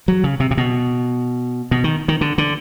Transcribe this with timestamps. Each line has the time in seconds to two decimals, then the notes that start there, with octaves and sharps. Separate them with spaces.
0.08 F#3
0.24 C#3
0.40 C3
0.51 C3
0.57 B2
1.71 B2
1.84 D#3
2.08 D#3
2.21 D3
2.38 D3